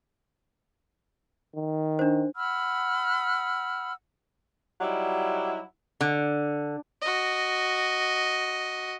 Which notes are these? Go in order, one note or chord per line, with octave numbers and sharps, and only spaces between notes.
D#3
D4 C5
F#5 B5 E6 F6
F#3 G3 D#4 E4
D3
F#4 D#5